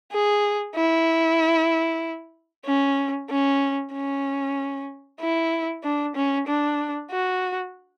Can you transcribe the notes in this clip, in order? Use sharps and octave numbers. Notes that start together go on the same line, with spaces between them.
G#4
E4
C#4
C#4
C#4
E4
D4
C#4
D4
F#4